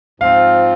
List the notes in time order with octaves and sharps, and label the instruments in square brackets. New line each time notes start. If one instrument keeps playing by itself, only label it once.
[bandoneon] G#2 F3 C4 F4 [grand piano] F5